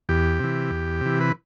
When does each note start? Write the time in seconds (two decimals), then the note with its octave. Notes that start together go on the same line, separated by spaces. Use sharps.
0.09 E2 G4
0.40 C3 E3
0.71 E2
1.01 C3 E3
1.20 B4